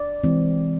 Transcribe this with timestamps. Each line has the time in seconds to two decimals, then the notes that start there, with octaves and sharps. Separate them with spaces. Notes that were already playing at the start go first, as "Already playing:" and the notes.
Already playing: D5
0.24 E3 G#3 C4